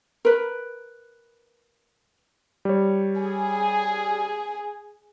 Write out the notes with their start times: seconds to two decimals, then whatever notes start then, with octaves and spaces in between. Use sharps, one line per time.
0.25 A#4 B4
2.65 G3 C#5
3.19 G#4